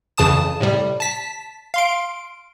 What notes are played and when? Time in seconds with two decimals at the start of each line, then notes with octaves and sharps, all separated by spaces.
0.17 F2 C#3 E3 A5 D#6 E7
0.61 A2 C3 G3
1.00 A5 B6
1.74 F5 C6 D7